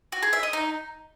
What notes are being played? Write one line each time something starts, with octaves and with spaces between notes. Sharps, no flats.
F#4
G#4
E5
D#5
D#4